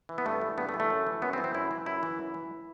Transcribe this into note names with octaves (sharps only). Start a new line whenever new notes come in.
E3
B3
G2 A3
E3
G2 B3
A3
E3
A3
F#2
E3
F#2 B3
C4
E3
C4
F#2 E4
E3
F#2 E4
E3
F#2
E3